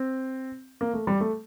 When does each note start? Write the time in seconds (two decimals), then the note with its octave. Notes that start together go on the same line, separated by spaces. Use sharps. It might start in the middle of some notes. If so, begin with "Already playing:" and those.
Already playing: C4
0.81 A#3
0.94 A3
1.07 G3
1.21 A3